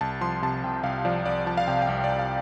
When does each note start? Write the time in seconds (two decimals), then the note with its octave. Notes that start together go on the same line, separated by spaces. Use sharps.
0.01 C2 A5
0.21 F3 C6
0.42 C3 A5
0.64 C2 G5
0.84 C2 F5
1.05 F3 D5
1.25 C2 D5
1.46 F3 A5
1.57 F5
1.67 C3 G5
1.82 G5
1.87 C2 F5
2.04 C2 D5
2.19 F5